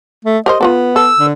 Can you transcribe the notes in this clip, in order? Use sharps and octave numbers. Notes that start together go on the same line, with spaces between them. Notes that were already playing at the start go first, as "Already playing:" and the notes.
A3
G4 A#4 C5 D#5
B3 F4 F#4 A4
A4 E6
D3